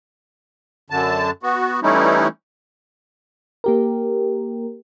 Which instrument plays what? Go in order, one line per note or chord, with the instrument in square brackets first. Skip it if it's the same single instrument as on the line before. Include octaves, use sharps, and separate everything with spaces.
[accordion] F#2 D3 A5
B3 F#4
E3 G3 A3 C#4 D#4 E4
[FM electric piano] A#3 G4 A#4